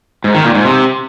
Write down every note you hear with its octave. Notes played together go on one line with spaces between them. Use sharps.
G#2
D#3
A#2
G#2
C3